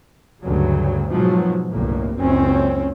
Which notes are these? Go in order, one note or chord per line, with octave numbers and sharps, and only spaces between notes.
D2 G2 C#3 F#3
G#2 B2 F3 F#3
G1 C2 A2 A#3
F#1 C#2 F#2 C4 C#4